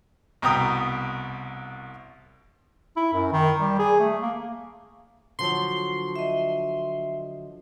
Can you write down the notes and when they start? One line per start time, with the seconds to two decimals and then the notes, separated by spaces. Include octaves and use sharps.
0.42 C2 B2 G5 A#5 D#6
2.97 E4
3.13 F#2
3.32 D#3
3.59 G3
3.79 G#4
4.00 A3
4.22 A#3
5.39 D3 F3 F#3 C6
6.16 D#5 E5